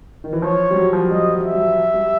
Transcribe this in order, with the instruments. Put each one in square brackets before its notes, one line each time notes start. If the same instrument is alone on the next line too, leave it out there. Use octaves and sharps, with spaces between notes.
[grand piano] D#3
E3
[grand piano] F3 [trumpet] C#5
[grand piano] G3
F#3
F3
[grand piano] G3 [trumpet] D#5
[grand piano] F#3
[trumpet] E5
[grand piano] G3
G3